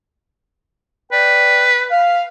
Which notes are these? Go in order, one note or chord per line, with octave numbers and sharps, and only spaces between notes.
B4 D5 G5
F5